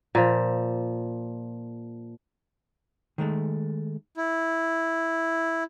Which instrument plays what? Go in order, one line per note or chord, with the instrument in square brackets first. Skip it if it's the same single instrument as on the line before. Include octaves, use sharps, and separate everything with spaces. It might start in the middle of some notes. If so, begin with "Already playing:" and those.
[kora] A#2 F3
[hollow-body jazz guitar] D#3 G#3 A3
[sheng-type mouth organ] E4